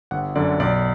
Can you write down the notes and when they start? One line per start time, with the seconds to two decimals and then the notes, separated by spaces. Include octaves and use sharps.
0.11 G1 F#5
0.36 F#2 D3 D5
0.60 B1 D5